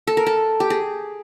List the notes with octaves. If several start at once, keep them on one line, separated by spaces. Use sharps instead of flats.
A4
A#4
A4
G4
G#4